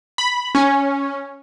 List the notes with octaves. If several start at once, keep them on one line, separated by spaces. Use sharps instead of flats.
B5
C#4